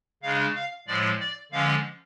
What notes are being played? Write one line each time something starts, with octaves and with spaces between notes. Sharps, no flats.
C#3 G#3 D4 F5
F5
A2 F3 G#3 D5
D5
D3 F3 G#3 C#4 F5